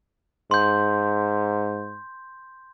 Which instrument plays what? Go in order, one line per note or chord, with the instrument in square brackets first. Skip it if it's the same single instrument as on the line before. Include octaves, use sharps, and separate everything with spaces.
[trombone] G#2 [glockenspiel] C6 G6